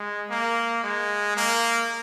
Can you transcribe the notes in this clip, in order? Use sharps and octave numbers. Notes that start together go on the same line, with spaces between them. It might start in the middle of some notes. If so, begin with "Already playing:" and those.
Already playing: G#3
A#3
G#3
A#3